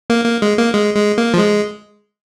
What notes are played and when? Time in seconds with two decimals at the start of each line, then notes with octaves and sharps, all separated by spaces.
0.10 A#3
0.25 A#3
0.42 G#3
0.58 A#3
0.74 G#3
0.96 G#3
1.18 A#3
1.34 F3
1.38 G#3